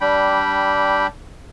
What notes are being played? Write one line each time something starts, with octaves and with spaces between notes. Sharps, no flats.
G3 D4 G5 B5